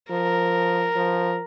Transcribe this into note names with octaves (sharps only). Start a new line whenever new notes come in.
F3 A#4
F3